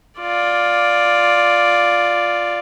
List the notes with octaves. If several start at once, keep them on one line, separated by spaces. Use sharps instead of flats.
F4 D5